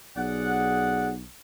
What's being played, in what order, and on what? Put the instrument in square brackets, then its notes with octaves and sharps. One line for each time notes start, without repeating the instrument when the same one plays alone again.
[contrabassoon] B1 [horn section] G#4 D5 F#5